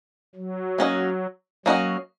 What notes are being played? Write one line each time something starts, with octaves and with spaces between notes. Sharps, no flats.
F#3
A#3 C#4 F#4 B4 D#5
F#3 A#3 C#4 F#4 B4 D#5